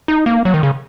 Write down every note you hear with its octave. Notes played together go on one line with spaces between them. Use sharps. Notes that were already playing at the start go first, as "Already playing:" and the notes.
D#4
A#3
F#3
D#3
C#3